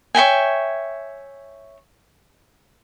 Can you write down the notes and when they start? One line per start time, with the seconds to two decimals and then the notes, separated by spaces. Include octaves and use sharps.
0.15 C#5 E5 G5 G#5